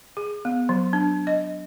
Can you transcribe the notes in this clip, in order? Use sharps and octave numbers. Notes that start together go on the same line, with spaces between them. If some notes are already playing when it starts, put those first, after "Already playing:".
G#4
B3
F#3
D4
D#5